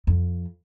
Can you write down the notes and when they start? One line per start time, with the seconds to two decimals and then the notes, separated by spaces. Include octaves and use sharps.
0.07 F2